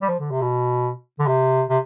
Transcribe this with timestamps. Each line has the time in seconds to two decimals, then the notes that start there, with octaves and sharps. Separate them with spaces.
0.02 G3
0.09 F3
0.20 D3
0.31 C3
0.42 B2
1.20 D3
1.27 C3
1.70 C3